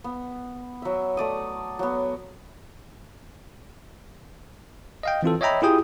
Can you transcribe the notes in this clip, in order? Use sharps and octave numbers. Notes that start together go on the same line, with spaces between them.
B3
F#3 E5
A3 D5 D#6
F#3 B3
D#5 F5 G5
E3 C4 F4 A4
C#5 D#5 E5 G5 A#5 B5
E4 F4 G4 G#4 G5 D#6